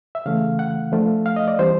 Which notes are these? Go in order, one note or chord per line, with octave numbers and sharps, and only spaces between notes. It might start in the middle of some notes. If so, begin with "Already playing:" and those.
E5
C#3 E3 A3 F5
F#5
F3 A3 D4 F4
F5
D#5
D5
E3 G3 C4 C5